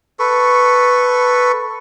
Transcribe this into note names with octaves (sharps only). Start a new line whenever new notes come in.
A4 B4 C#6